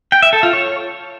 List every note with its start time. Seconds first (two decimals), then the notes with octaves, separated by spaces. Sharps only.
0.12 G5
0.22 E5
0.33 A4
0.43 F4
0.53 C#5